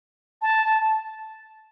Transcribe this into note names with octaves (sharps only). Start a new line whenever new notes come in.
A5